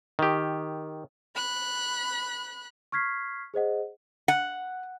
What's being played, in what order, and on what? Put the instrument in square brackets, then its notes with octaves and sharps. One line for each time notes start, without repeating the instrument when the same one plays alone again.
[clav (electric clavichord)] D#3 G4
[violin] B5 F#6
[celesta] C#6 F6 G#6 B6 C7
G#4 C5 D#5 F#5
[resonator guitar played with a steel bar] F#5